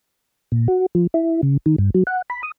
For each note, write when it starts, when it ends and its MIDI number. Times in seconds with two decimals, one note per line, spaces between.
0.52 0.68 46
0.68 0.86 66
0.95 1.07 53
1.14 1.41 64
1.43 1.57 49
1.66 1.76 51
1.78 1.90 43
1.95 2.03 54
2.07 2.22 78
2.30 2.42 83
2.43 2.51 87